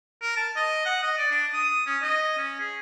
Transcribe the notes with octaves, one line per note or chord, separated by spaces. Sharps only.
A#4
A5
D#5
F#5
D#5
D5
D4
D#6
C#4
D#5
C#4
G#4